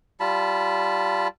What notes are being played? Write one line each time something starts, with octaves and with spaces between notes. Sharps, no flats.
G3 F4 A5 B5